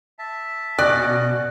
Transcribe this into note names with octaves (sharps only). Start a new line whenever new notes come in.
E5 A5
B2 C#4 F#4 D5 D#5 F#6